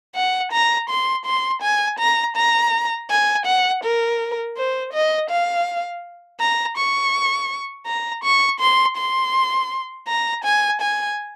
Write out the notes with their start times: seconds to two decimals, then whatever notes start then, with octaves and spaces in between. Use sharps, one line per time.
0.15 F#5
0.52 A#5
0.90 C6
1.26 C6
1.62 G#5
1.99 A#5
2.37 A#5
3.10 G#5
3.46 F#5
3.84 A#4
4.57 C5
4.93 D#5
5.30 F5
6.40 A#5
6.77 C#6
7.87 A#5
8.24 C#6
8.60 C6
8.97 C6
10.08 A#5
10.44 G#5
10.81 G#5